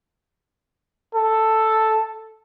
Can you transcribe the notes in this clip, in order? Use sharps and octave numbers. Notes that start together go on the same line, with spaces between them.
A4